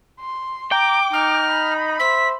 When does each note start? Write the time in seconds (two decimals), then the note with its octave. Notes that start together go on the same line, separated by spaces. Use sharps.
0.20 C6
0.72 G5 A#5 D6
1.13 D#4 D6 F6
1.50 B5
1.99 C5 E5 B6